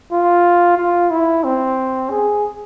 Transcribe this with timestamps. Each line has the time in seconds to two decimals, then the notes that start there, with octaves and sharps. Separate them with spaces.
0.11 F4
0.77 F4
1.11 E4
1.44 C4
2.10 G#4